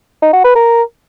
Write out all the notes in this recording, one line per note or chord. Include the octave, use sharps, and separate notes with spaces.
D#4
F#4
B4
A#4